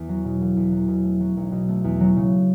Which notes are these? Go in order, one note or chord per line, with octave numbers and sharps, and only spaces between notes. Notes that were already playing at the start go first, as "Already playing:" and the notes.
Already playing: E2
F#3
B2
E1
E2
F#3
B2
A3
F#3
B1
B2
A3
E2
F#3
C#3